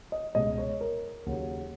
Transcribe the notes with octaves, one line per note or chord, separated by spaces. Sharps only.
D#5
C#2 B2 G#3 D#5
C#5
A#4
D#2 C#3 F#3